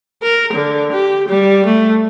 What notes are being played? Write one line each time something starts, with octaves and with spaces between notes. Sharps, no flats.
A#4
D3
G4
G3
A3